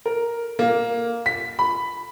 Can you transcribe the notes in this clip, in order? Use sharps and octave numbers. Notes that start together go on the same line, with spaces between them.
A#4
A#3
B6
B5